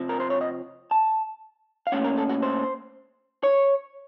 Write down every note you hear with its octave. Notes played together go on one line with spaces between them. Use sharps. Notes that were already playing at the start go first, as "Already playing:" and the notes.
Already playing: F2 C3 F3
A#4
C5
C#5
D#5
A5
F5
A#2 A3 C#4 F#5
A#4
A4
F#4
C5
C#5